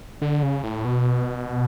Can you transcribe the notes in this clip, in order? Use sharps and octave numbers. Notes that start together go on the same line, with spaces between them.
D3
C#3
A2
B2